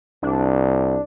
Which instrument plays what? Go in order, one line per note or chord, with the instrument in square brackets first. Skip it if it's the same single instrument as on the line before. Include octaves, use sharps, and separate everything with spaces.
[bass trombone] C2 [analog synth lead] D4